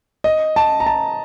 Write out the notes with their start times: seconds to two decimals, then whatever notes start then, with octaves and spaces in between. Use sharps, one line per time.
0.24 D#5
0.56 A5
0.80 A#5
0.86 A5